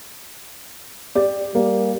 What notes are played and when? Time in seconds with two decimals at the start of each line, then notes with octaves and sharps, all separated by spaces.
1.15 G4 D5
1.55 G3 A#3